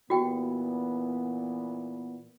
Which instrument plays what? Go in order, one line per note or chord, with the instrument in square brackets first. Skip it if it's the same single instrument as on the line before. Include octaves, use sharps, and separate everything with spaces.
[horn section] A#2 E3 B3 [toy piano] F#4 G4 G5